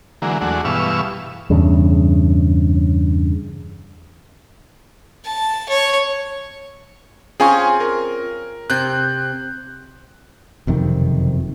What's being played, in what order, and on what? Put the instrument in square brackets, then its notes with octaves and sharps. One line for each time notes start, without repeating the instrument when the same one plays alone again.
[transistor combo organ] D3 E3 F#3 G#3 A#3
E2 G#3 A3 D4 F#4
G2 B2 E3 F5 C#6 E6
[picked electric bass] E2 G2 C#3
[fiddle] A5
C#5
[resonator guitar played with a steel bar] C4 C#4 F4 [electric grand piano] G#4 G#5 C#6
[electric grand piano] A#4
[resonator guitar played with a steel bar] C3 C4 [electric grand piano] F#6 G6
[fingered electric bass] F#1 F2 C3 D#3